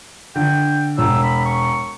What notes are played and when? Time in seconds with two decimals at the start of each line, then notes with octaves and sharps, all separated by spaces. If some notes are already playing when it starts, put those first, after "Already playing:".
0.36 D3 G5
0.98 E1 E6
1.23 B5
1.45 C#6